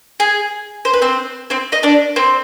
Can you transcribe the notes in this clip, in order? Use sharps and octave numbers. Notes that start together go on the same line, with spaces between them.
G#4
C5
B4
C4 C5
C4 C5
D#4 D#5
D4 D5
C4 C5